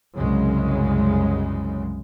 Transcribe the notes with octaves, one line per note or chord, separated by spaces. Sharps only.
C2 F#2 C#3 G#3